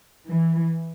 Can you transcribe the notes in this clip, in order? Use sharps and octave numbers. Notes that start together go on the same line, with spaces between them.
E3